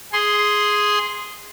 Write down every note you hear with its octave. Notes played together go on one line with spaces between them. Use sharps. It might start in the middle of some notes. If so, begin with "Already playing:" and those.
G#4 C6